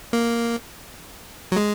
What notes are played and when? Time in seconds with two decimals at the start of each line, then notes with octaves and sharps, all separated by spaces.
0.13 A#3
1.52 F#3
1.56 G#3